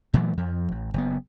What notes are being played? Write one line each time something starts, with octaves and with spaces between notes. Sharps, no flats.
A#2 E3 F#3 A3
F2 F3
A1
F#1 B3